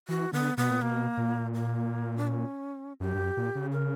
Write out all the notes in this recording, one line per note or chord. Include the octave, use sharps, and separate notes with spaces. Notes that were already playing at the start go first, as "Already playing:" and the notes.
E3 F#4
D3 B3
B2 B3
A#2
B2 A#3
A#2
A#3
D4
C#4
F#2 G4
G2
F#2
A#2
C#3
A#4